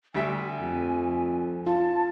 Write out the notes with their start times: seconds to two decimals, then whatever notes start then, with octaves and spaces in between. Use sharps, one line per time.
0.14 D2 G3 E5 G#5
0.60 F2
1.67 F4 A5